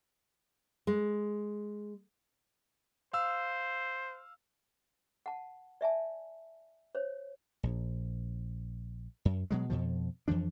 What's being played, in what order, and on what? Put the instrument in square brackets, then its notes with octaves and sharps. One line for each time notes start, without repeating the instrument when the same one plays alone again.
[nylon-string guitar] G#3
[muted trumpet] C5 [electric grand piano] F5 E6
[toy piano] F#5 A5
D5 E5 G#5 A5
C5 C#5
[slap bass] A#1
F#2
B2 F#3 G#3
F2 B2 F3
F2 E3 F3 D4